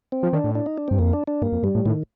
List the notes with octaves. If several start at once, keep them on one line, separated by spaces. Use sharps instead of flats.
C4
F3
D#3 D4
A2
D4
D#4
D4
G2 C4
F2 A#3
D4
D4
G2 A#3
F2
G2 G3
A2
A2 D#3